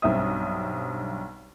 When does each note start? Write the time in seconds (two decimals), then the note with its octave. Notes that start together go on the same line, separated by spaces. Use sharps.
0.02 B1 G2 C4 E5 D#6